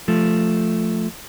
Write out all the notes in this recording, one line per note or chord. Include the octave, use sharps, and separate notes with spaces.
F3 A3